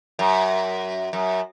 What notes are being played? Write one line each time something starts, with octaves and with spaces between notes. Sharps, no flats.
F#2
F#2